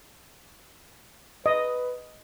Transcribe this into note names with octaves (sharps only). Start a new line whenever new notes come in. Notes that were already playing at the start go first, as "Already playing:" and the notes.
B4 D#5